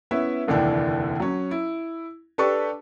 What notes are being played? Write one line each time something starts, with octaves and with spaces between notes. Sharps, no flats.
B3 C#4 E4 E5
F1 D#2 D3 E3 D4 G5
F#3 C#4
E4
D4 G4 A4 B4 A5 C#6